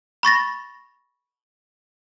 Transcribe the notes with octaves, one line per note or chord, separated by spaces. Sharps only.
B5 C#6 A6 A#6